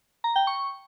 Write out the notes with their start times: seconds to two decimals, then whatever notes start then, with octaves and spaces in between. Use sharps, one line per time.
0.24 A#5
0.36 G5
0.47 C#6